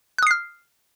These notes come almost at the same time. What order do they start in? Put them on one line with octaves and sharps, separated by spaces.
F#6 D#6 C7 F6